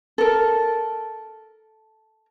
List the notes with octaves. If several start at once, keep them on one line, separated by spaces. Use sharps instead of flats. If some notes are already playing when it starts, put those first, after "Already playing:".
A4 A#4